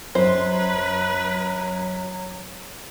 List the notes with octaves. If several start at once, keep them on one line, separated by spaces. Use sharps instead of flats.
F#2 F#3 B4 C5 C6